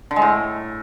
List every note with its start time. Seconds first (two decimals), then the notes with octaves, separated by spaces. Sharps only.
0.11 D3
0.16 G#3
0.22 A2